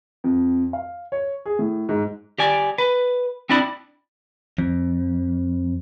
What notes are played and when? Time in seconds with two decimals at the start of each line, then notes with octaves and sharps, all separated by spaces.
0.24 F2
0.73 F5
1.12 C#5
1.46 G#4
1.59 A2
1.89 G#2
2.38 G4 D5 G#5
2.78 B4
3.49 C4 D4 E4 D5 B5
4.58 F2